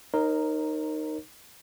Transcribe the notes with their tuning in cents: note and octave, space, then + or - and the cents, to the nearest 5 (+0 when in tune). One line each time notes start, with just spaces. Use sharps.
D#4 -10 A#4 +0 C#5 -45